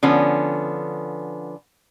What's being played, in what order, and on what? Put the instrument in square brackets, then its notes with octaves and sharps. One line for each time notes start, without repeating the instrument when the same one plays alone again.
[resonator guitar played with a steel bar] D3 F3 B3 C#4